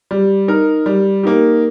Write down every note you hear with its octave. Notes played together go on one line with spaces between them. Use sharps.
G3
D#4 A#4
G3
A#3 D#4 G4